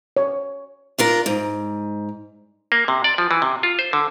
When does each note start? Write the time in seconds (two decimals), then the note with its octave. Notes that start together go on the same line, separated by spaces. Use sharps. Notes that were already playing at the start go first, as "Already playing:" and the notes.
0.17 C#5
0.98 D4 F4 A#4
1.26 G#2
2.72 A#3
2.88 C3
3.04 D5
3.18 F3
3.31 E3
3.42 C3
3.63 F4
3.79 C5
3.93 D3